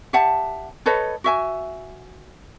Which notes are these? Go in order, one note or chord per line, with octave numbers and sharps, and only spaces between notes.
G4 E5 F#5 A5
A4 B4 C#5 D#5
F#4 E5 G#5